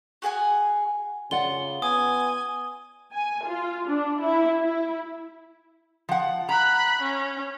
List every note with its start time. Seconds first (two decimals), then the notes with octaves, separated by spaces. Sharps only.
0.22 F#4 G#4 F#5 G#5
1.31 C#3 F4 D5 F#5 G7
1.82 B3 G#5 D#6
3.13 G#5
3.44 F4
3.87 D4
4.20 E4
4.60 E4
6.09 F3 F#5
6.49 A#5 B5 F#6
7.02 C#4